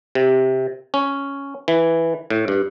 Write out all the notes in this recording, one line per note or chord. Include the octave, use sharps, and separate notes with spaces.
C3
C#4
E3
A2
G2